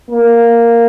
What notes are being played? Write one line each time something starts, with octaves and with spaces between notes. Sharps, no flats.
A#3